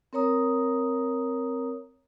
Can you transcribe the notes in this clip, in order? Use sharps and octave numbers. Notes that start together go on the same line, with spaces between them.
C4 A#4 C#5 A#5 D#6